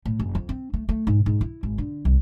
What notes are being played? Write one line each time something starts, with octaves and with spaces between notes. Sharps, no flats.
A2
F#1
F2
C4
A3
A3
G#2
G#2
E4
G#1
D3
C2